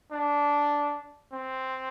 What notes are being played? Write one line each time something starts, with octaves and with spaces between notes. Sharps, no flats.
D4
C4